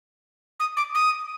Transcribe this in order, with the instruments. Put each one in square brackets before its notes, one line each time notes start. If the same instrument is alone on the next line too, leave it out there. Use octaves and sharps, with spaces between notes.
[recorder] D#6
D6
D#6